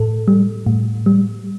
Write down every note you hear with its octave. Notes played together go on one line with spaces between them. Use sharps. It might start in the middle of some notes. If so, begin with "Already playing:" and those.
Already playing: A2 A4
G3
A2
G3